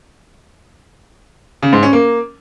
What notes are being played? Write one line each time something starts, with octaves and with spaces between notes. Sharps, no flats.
C#3
G#2
C#4
A#3